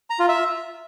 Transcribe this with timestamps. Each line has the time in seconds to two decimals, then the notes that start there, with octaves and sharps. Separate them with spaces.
0.10 A#5
0.19 F4
0.29 E5